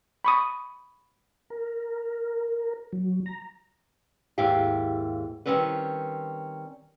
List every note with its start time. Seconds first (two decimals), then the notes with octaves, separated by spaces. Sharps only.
0.24 B5 C#6 D#6
1.50 A#4
2.93 F#3
3.26 A#5
4.38 D#2 G#2 E4 G4 F5
5.46 D#3 F3 G3 C4 C#4 B4